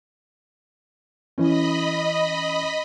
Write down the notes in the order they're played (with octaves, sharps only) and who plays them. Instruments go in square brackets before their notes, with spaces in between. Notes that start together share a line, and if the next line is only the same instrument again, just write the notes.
[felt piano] E3 C#4 [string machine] D#5 B5